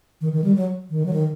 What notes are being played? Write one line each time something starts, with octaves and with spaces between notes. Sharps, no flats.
D#3
D#3
G3
F#3
D#3
F#3
D#3